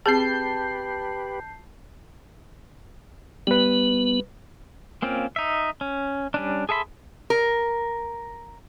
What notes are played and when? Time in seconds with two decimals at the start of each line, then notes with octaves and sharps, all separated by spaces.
0.06 C4 G4 G#4 B4 A5 G6 C7
3.47 G3 B3 B4
5.02 A#3 C4 C#4 F4
5.36 D#4 E5
5.81 C#4
6.34 G3 C#4 D4
6.69 G#4 A4 E5 B5 C6
7.30 A#4